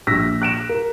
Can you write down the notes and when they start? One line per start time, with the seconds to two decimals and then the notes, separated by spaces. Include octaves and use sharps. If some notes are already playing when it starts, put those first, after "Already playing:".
0.07 A#1 E6 A#6 B6
0.42 F#6 D7 E7
0.69 A#4